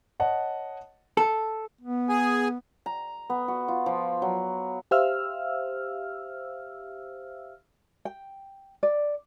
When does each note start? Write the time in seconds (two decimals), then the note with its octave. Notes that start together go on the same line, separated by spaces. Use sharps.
0.20 C#5 D#5 F#5 A5
1.17 A4
1.81 B3
2.09 G#4 G#5
2.86 A#5
3.30 B3
3.48 F#4
3.68 F4
3.86 F3
4.22 F#3
4.91 G4 C5 E5 F5 E6 F6
8.05 G5
8.83 D5